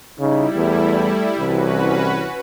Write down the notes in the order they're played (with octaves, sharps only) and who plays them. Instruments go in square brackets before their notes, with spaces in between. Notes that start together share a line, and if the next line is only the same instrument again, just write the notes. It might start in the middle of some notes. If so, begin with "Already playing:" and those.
[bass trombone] C#3 [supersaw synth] G3 E4 [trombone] D#4
[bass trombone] E2 [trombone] A3
[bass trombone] C2 [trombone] E3 [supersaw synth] C#4 F#4 B4